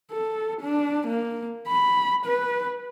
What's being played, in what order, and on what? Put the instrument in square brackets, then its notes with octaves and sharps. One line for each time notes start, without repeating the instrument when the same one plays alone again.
[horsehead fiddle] A4
D4
A#3
B5
B4